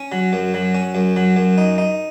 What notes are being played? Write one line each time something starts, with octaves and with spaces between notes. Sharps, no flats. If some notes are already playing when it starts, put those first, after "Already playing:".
Already playing: C#4
F#3
F#2
F#3
C#4
F#2
F#3
F#2
D#4
D#4